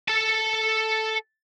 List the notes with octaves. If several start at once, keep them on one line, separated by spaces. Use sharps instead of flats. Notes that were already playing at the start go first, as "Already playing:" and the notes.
A4 A5